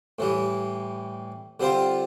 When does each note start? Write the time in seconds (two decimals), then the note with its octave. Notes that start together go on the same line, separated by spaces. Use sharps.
0.19 A2 E3 G3
1.60 D3 G3 C4 F4 C5